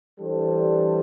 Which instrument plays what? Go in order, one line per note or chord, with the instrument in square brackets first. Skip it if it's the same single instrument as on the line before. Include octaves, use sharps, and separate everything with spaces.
[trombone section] E3 G3 D4 A4 C5